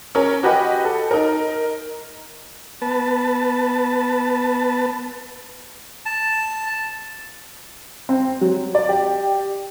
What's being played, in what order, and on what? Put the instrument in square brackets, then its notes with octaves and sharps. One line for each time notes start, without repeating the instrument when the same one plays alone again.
[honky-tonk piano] C#4 A#4
F#4 G4 B4 D#5 F#5 G#5
A4
D#4 A#4
[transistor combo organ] B3 B4 A5
[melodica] A5
[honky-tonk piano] C4
F#3
D5
G4